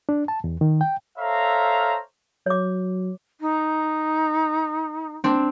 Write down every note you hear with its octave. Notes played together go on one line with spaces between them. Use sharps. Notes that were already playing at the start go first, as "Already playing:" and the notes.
D4
A5
E2
D#3
G5
A4 C5 C#5 E5 F5 A#5
F#3 C#5 D6
D#4
C4 D4